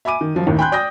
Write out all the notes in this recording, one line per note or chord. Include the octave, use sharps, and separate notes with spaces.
E5 G#5 B5 D6 D#7
D#3
F#2 F3 F#3
D#2 A2 D#3
G5 G#5 B5 C6 F#6 G6
D5 G5 D#6 G6 A#6